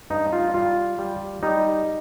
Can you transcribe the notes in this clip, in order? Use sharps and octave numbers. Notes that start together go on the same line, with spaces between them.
G2 D#4
F4
G3 F4
G3
G3 D#4